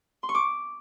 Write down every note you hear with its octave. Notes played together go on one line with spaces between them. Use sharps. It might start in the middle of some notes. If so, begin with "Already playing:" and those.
C6
C#6
D6